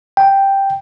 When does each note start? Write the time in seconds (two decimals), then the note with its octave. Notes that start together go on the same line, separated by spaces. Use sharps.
0.17 G5